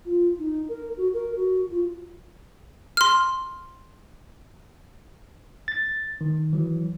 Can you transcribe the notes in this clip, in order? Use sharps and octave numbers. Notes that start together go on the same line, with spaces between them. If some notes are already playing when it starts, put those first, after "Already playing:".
F4
D#4
A#4
F#4
A#4
F#4
F4
C6 F6
A6
D#3
E3 F#3